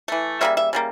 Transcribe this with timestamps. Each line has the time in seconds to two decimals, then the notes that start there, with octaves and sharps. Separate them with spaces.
0.08 E3 A3
0.41 C#3 G3 A#3 E5
0.57 E5
0.73 C#3 G3 A#3